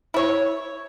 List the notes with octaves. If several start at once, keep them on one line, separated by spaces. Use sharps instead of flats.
E4 C#5